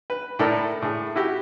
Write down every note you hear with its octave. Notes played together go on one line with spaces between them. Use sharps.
B4
A2 E4 A4 A#4 D5
A2 G#4
E4 F#4 G4